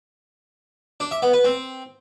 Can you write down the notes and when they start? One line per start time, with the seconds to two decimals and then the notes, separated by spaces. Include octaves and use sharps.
1.00 D4
1.11 E5
1.22 B3
1.33 B4
1.44 C4